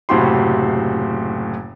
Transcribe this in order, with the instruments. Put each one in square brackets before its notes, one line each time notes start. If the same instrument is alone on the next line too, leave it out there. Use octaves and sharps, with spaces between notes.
[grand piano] F#1 A2 C3 F#4 G4 C6